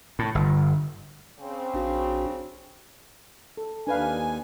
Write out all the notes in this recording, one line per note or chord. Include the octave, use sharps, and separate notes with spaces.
A2
G1
C#3 C4
A#1 D4 F#4
A4
D#2 D4 B4 F5 G#5